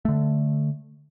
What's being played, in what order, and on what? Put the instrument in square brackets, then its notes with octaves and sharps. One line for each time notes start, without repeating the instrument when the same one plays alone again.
[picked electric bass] D3 A3